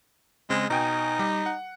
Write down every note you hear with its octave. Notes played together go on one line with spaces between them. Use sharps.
C#3 G#3 C4
B2 D#4 G5 G#5
G3 G4
F#5